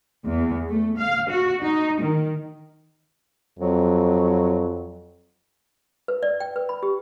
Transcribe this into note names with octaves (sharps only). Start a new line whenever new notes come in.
E2
A3
F5
F#4
D#4
D#3
F2 F#3
B4
D5
G5
B4
B5
G4